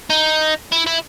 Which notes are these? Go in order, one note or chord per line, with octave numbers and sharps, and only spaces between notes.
D#4
E4
E4